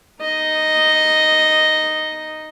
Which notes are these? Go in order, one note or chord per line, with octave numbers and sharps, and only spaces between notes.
D#4 D#5